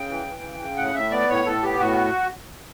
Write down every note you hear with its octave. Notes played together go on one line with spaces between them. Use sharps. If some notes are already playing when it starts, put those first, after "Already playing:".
Already playing: C#3 G5
E3
E3
C#3
C#3
A2 F#5
A2 E5
B3 D5
A2 C#5
A2 A4
B3 G4
A2 F#4